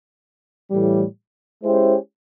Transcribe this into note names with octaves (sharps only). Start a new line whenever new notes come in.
A2 E3 G3
G#3 C#4 E4 G4 C5